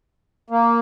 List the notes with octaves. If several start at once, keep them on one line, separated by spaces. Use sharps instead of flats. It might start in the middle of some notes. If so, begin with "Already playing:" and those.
A#3